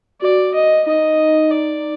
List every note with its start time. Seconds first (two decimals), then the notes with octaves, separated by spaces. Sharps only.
0.21 F#4 D5
0.54 D#5
0.86 D#4 D#5
1.51 D5